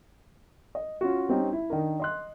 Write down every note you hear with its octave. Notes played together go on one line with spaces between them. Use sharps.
D#5
C#4 F4 F#4
G3 C4 C#4 D#4
E4
D#3 D4 A#4
D#5 C6 F#6